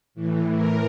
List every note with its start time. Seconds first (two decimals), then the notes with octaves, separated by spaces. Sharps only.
0.15 A2 E3
0.56 A#4